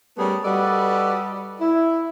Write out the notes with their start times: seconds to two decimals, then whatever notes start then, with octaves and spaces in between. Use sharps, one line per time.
0.17 G3 A3 B3 C#4 G#4 A#4
0.45 G3 F#4 A4 B4 D5 D#5
1.60 E4